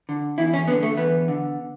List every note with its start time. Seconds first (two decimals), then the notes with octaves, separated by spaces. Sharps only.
0.09 D3
0.38 E2 E4
0.53 C#4
0.68 D3 B3
0.83 A3
0.97 E2 B3
1.28 D3